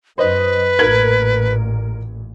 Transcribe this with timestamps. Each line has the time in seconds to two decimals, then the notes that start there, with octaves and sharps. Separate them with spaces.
0.18 F#2 B4 C5 D#5
0.79 A1 A#2 A#4 G#6 F#7